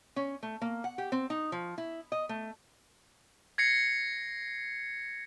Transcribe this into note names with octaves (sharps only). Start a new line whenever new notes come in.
C#4
A3
A#3
F#5
G4
C4
D#4
F3
E4
D#5
A3
G#6 A#6 C7 C#7